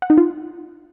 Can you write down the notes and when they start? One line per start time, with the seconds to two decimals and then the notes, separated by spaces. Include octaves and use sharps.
0.02 F#5
0.10 D#4
0.18 F4